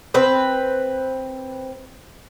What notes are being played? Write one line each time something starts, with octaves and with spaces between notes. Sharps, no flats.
C4 B4